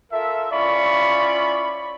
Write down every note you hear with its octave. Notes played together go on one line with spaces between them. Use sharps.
F4 A4 A#4 E5
C#4 E4 F4 D5 B5 C#6